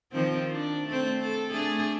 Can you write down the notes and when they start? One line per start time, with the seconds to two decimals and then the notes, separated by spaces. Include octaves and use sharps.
0.12 D#3 F3 C4
0.51 D4
0.88 A3 C4
1.22 A4
1.52 A3 D4 G#4